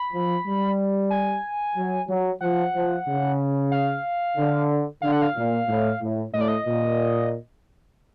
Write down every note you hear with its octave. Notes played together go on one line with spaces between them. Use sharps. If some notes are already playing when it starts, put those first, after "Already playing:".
Already playing: B5
F3
G3
G#5
F#3
F#3
F3 F#5
F3
C#3
F5
D3
D3 F5
F#5
F5
A#2
A2
A2
A2 D#5
D5
D#5
A#2